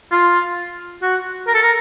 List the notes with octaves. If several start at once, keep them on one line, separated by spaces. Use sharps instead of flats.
F4
F#4
A#4
A4
A#4